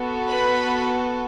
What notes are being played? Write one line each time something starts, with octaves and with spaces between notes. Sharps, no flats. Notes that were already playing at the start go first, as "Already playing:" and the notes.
Already playing: B3 F#4 A4
B4 B5